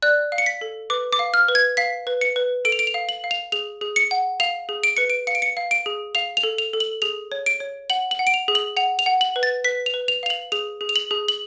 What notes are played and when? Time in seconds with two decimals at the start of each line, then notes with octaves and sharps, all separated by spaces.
0.02 D5 F#6
0.32 F5
0.38 C#7
0.46 B6
0.61 A4
0.90 B4 D6
1.13 D6
1.19 F5
1.34 F6
1.48 B4
1.55 G#6
1.77 F5 B6
2.07 B4
2.21 C#7
2.36 B4
2.65 A4 D7
2.72 F7
2.79 D7
2.87 F7
2.94 F5
3.09 F#7
3.24 F5
3.31 F7
3.52 G#4 F7
3.81 G#4
3.96 C#7
4.11 F#5
4.40 F5 F7
4.69 G#4
4.84 D7
4.97 B4 C#7
5.10 D7
5.27 F5 C#7
5.35 D7
5.42 C#7
5.57 F5
5.71 D7
5.86 G#4
6.15 F5 F7
6.37 F7
6.43 A4
6.58 F7
6.73 A4
6.80 F#7
7.02 G#4 F7
7.32 C#5
7.46 D7
7.60 C#5
7.90 F#5 F#7
8.11 F#7
8.19 F#5
8.27 D7
8.34 F7
8.48 G#4
8.55 F#7
8.77 F#5 F7
8.99 F7
9.06 F#5
9.21 F#7
9.36 B4
9.43 A6
9.64 B4 B6
9.86 F7
9.94 B4
10.08 F7
10.23 F5 F7
10.30 F#7
10.52 G#4 F7
10.81 G#4
10.89 F7
10.96 F#7
11.11 G#4
11.28 F#7